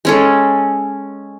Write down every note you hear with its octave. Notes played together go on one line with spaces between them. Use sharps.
G#3 C#4 A4